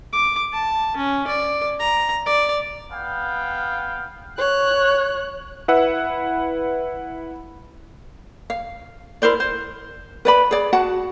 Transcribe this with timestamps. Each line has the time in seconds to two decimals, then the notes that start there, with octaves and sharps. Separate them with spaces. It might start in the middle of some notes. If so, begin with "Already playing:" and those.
0.13 D6
0.53 A5
0.97 C#4
1.27 D5
1.80 A#5
2.26 D5
2.92 B3 F5 G5
4.38 C#5 F#6
5.68 E4 B4 E5 F#5 E6
8.50 F5
9.22 E4 A#4 C5 D5
9.40 C5
10.25 B4 D5 B5
10.51 G#4 D5
10.73 F#4 F#5 A5